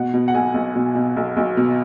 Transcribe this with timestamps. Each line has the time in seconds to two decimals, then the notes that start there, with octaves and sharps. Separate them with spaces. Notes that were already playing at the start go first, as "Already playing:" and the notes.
Already playing: B2 F#5
0.14 B2
0.28 F#5
0.34 B1 G#5
0.54 B1
0.76 B2
0.95 B2
1.16 B1
1.37 B1
1.57 B2